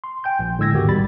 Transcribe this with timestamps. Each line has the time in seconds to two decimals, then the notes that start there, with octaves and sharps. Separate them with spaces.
0.04 C6
0.24 G5 G#5 G6
0.39 A#1
0.58 A2 D3 G#3 E6 G#6 A#6
0.72 A1 E2 G#2 D#3 F#4 G4
0.88 B1 G3 B5 A6